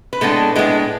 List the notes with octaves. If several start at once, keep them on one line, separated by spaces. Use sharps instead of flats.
B4
A2 G#3 B3 D4 A4
A2 G#3 B3 D4